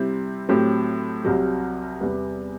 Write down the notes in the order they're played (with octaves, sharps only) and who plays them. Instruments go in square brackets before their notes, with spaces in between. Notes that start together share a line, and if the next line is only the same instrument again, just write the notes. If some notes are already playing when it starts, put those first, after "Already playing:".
Already playing: [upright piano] C3 G3 C4 E4
A2 F#3 C4 G4
C2 C3 F#3
E2 C3 G3 B3